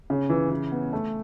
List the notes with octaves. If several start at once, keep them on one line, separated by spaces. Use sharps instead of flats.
C#3
E3
E3
B3
A3